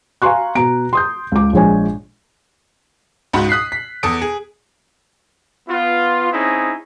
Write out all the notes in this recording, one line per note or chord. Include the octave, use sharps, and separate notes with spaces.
F5 G#5 A#5 C6 C#6 F#6
B2 A#5 D7
C6 D#6 G6
C#2 D6
A#1 F3 G#3 C#5 G#5
C#2 G#2 F#4 B5
D#6 F#6 B6 C7
B6
E2 A4 D#6 D7
G#4
B3 F4
C4 C#4 D#4 E4 G#4